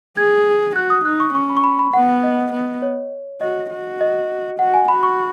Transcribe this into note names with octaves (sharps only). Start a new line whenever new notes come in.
G#4 G#6
F#4 F#6
D#6
D#4 F#6
C#6
C#4 C#6
B5
C#6
B5
B5
B3 F#5
D#5
B3
C#5
F#4 D#5
F#4
D#5
F#4 F#5
G#5
F#4 B5
C#6